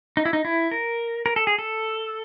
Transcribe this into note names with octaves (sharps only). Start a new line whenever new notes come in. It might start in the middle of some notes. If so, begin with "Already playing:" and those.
D#4
E4
D#4
E4
A#4
A#4
A4
G#4
A4